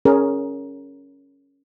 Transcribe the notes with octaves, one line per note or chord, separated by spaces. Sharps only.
C#4 G#4 A#4